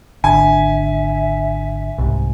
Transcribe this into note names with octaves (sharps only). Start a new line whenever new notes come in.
G#1 D3 E5 G#5
C2 G#2